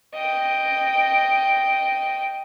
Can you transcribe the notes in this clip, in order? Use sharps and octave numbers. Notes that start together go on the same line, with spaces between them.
D#5 G5